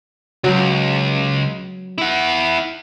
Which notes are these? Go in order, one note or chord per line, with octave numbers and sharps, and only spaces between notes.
C#2 F#3
E4 F#5